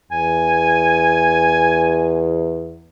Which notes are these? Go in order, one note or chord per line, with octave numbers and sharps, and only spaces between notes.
E2 G#5